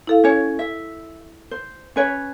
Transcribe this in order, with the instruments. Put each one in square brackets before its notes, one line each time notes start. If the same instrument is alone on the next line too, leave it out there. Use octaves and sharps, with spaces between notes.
[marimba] E4 A4 F5
[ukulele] C#4 C#5
E5
C5
C#4 B4 C#5